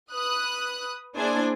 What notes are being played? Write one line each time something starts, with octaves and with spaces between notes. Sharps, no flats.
B4 D#6 F#6
A#3 D4 E4 G#4 C5 G#5